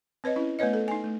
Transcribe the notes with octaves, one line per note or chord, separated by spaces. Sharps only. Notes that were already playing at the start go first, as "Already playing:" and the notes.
C4 B4 C#5 D#5
C#4 E4
A3 B3 B4 C#5 D#5
A4
D#4 G#5
A3